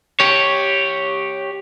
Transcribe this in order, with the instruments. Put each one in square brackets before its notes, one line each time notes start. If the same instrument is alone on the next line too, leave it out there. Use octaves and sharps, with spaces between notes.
[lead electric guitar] G4 C#5